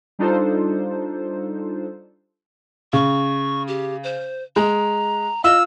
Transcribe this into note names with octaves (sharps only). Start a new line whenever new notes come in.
G3 D4 D#4 F4 A4 C5
C#3 C#6
G4
C5
G#3 A#5
F4 D#5 E6